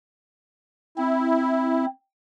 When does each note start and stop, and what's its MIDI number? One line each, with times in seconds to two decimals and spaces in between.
0.98 1.86 60
0.98 1.86 64